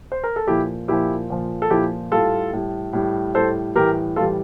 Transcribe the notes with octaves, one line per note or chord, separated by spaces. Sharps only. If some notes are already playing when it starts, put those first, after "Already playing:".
C5
A#4
A4
A#2 F3 E4 G4
A#2 F3 E4 G4
A#2 F3
A4
A#2 F3 E4 G4
A2 G3 F4 A4
A2 G3
A2 G3
A2 G3 A4 C5
A2 E3 G3 G4 A#4
A2 E3 G3 F4 A4